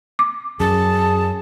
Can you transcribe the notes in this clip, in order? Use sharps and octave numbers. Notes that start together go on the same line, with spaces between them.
D6
F#2 G#4 A5